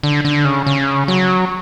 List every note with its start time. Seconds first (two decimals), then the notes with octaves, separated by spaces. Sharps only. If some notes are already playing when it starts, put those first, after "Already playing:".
0.03 D3
0.25 D3
0.45 C#3
0.66 C#3
1.08 F#3